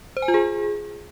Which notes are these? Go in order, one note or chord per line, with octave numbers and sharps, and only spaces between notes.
C5
G#5
F4
G#4